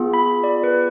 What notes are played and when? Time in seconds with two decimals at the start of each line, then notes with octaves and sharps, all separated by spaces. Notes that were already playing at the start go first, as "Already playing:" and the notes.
Already playing: B3 F4 G#4
0.14 B5
0.44 D5
0.64 B4